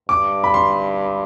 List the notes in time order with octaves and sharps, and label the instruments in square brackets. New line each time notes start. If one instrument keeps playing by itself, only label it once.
[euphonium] G2 [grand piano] D6
[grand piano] B5
C6